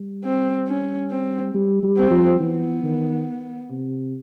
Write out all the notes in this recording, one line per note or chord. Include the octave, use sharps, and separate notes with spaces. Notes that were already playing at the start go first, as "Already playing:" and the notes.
Already playing: G3
C4
C#4
C4
G3
G3
C4
F3
E3 B3
D#3
C3